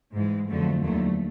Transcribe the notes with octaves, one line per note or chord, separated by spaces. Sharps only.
G#2 E3 G#3
F2 D3 F#3 A3
D#2 D3 F#3 A3